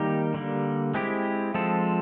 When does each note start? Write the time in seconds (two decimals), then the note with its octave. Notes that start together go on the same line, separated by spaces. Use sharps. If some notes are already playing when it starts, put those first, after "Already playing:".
Already playing: D#3 G3 A#3 D#4 G4
0.34 D3 G3 A#3
0.94 G#3 C4 E4 G4
1.54 F3 G#3 C4 F4 A4